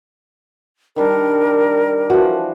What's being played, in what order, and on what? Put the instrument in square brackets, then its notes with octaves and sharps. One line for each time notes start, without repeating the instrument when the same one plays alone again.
[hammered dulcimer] D#3 G3 D4 [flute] A#4
[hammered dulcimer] E3 F3 [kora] F#4